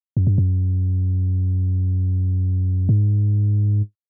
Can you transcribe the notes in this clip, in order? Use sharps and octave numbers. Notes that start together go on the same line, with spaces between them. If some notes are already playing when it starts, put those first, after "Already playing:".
F#2
G2
F#2
G#2